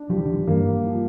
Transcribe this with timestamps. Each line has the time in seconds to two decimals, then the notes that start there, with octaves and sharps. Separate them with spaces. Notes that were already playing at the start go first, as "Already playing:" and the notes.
Already playing: D4
0.09 F3 G4
0.17 E3
0.25 D3
0.33 E3
0.47 G2 A#3
0.87 F3